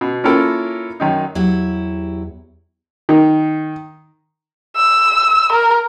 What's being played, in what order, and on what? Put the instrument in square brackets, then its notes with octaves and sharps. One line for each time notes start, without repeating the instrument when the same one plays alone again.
[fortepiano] B2
A#3 C#4 E4 F4 A4 A#4
F#2 D#3 D#4
[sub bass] E2 [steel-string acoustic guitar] F#3 E4 G4
[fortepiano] D#3
[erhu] E6
A#4